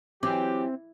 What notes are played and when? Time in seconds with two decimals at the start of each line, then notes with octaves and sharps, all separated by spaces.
0.23 E3 F#3 C4 G4 D6